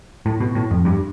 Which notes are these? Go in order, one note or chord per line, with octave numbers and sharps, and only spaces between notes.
A2
B2
A2
F2
G2